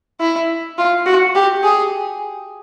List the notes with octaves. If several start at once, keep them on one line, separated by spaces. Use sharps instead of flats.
E4
F4
F#4
G4
G#4